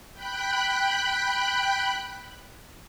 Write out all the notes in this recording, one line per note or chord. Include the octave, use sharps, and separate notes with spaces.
G5 B5 F#6